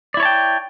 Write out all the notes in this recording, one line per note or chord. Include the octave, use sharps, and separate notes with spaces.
E4 C#5 D5 G5 A5